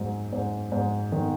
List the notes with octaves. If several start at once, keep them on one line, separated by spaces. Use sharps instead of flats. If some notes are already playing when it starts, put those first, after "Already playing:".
Already playing: G#2 F#3
G#2
G#2
D#3